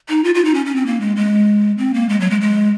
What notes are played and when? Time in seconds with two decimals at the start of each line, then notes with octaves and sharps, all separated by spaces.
0.09 D#4
0.24 F4
0.35 F4
0.45 D#4
0.54 C#4
0.66 C#4
0.76 C4
0.86 A#3
1.01 G#3
1.16 G#3
1.78 C4
1.94 A#3
2.09 G#3
2.20 F#3
2.31 G#3
2.41 G#3